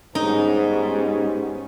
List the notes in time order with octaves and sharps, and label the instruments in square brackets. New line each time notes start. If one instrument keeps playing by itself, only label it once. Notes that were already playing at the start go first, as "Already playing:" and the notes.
[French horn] G#2 [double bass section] G3 B3 C#4 [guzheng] D#4